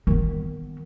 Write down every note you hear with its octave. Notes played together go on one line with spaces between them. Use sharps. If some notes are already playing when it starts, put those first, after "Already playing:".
D#3 B3